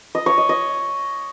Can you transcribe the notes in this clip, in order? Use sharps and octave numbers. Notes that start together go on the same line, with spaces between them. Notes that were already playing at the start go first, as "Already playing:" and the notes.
D#5
C#5
D#5
D#5